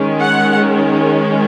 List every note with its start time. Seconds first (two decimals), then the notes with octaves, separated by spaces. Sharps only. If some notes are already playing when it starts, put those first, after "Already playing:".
Already playing: D#3 G#3 C#4
0.20 F#5